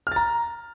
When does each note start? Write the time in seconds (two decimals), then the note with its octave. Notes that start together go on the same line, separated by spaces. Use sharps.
0.07 F6
0.12 A6
0.16 A#5